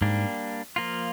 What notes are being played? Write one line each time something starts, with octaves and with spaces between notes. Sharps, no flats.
G#2 G3 A#3 D4
F3 A#3 F4